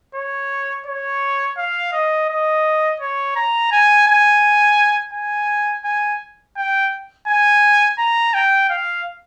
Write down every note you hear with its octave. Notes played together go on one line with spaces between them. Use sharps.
C#5
C#5
F5
D#5
D#5
C#5
A#5
G#5
G#5
G#5
G#5
G5
G#5
A#5
G5
F5